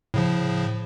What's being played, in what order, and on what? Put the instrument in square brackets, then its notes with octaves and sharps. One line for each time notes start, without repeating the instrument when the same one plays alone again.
[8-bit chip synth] A2 C#3 F3